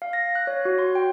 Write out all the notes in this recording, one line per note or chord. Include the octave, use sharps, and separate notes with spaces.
F5
A#6
F#6
C#5
F#4
C6
G5